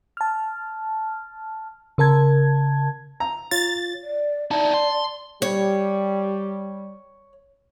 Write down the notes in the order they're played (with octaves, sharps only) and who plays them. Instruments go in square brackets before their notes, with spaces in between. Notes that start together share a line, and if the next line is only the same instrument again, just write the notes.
[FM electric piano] A5 F6
C#3 A#4 A5 G#6
[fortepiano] A#5
[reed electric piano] F4 C#5 [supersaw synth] A6
[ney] D5
[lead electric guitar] D#4 E4 [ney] D5 [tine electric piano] A5
[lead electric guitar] C6
[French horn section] G3 [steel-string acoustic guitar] C#5